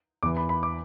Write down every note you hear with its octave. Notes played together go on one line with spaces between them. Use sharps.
E2 E3 D6
B5
B5
D6